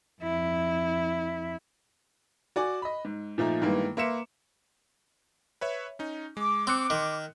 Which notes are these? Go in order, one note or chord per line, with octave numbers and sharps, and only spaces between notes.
F2 E4
F#4 D5 G#5
D#5 B5
G#2
A#2 F3 A3 D#4
G2 D#3 E3 G#3 A#3 B3
A#3 B4 E5 C6 C#7 E7
B4 C#5 E5
C#4 D#4
G#3 D6
C4 C6 F#6 C#7
D#3